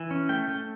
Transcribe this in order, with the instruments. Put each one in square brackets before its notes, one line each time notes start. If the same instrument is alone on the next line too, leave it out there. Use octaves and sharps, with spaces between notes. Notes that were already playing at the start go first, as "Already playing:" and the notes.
Already playing: [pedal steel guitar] E3
C#4
A3 G5
A3